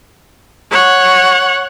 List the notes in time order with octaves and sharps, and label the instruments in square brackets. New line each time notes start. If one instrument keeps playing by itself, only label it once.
[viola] C#5 F#5